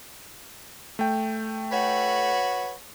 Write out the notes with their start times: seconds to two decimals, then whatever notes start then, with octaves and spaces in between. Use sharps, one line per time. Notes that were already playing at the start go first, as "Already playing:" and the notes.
0.99 A3 G5
1.72 F#4 B4 C#5